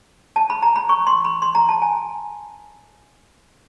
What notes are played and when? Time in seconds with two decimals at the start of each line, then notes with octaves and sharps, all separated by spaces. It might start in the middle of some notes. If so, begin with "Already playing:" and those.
0.36 A5
0.50 B5
0.62 A#5
0.76 B5
0.89 C#6
1.07 C6
1.25 B5
1.42 C6
1.55 A#5
1.69 A5
1.82 G#5